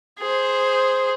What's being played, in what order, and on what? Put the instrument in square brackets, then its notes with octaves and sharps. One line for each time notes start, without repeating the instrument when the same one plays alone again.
[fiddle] G#4 C5